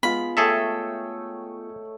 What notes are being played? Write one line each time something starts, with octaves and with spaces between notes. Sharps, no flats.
G#3 B3 F4 B5
A3 G#4 A4 C#5 E5 G5